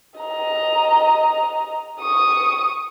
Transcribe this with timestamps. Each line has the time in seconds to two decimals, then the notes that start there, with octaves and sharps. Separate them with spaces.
0.20 D#5 A#5
2.00 C#6 D#6